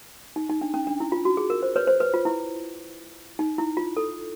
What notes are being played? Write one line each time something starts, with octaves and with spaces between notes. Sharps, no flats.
D#4
D#4
D4
C#4
D4
E4
F4
F#4
G#4
A#4
C5
B4 C#5
C5
B4
F4
E4
D#4
E4
F4
A4